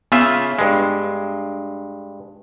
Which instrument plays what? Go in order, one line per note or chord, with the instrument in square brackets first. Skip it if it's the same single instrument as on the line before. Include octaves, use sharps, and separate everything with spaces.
[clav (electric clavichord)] C#3 F4 E5 [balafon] B3
[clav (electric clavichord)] G2 G#3